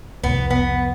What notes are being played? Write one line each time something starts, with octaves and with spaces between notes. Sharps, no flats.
C2 F2 B3
B3